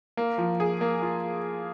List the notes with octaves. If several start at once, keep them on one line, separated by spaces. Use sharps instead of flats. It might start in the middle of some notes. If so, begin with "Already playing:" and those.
A#3
F3
G#4
A#3
F4